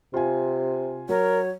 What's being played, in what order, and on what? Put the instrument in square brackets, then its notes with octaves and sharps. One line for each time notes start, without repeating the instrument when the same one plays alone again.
[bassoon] C3 [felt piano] F4 G#5
[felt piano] F#3 [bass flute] A#4 [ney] C#5